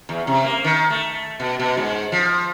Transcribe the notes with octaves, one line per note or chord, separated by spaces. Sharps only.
E2
C3
A#3
D#3
A3
B2
B2
G#2
F3